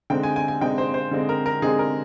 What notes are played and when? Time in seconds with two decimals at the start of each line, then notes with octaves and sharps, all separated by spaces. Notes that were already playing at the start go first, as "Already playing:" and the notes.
0.10 D3 G#3 C4 D#4 G5
0.23 G#5
0.36 G#5
0.48 G#5
0.61 D3 G#3 C4 D#4 G5
0.78 C5
0.94 C5
1.11 D3 G#3 C4 D#4
1.29 A#4
1.46 A#4
1.62 D3 G#3 C4 D#4 G#4
1.79 A#4